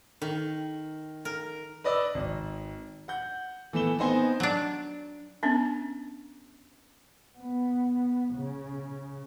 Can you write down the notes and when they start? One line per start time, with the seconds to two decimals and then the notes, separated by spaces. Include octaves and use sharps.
0.22 D#3
1.25 A#4
1.84 B4 D5 D#5 D#6 E6
2.14 G#1
3.08 F#5 G6
3.73 E3 A3 B3 E7 G7
3.99 B3 C4 D#4 C5 G#5
4.40 F#3 D4
5.43 B3 C#4 D4
7.38 B3
8.35 C#3